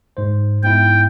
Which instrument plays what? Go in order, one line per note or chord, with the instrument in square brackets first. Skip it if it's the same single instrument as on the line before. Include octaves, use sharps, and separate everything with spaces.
[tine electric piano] G#2 C5
[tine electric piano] G#2 B3 E4 [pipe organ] G5